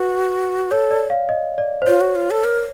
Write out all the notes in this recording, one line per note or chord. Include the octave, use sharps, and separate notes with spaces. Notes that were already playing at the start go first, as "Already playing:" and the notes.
Already playing: F#4 B4
A4 C#5
D5
F5
D#5
D5
C5
F4 C#5
F#4
F4
A4
A#4